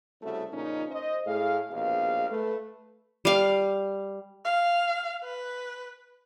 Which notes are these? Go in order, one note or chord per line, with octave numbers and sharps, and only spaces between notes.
C2 C#3 A3 C#4 F#4 E5
A#2 C#3 F3 C#4 D#4
C5 D#5
A2 G#4 F5
A#1 D#2 B2 G#4 F5
A3 A4 B4
G3 F5
F5
B4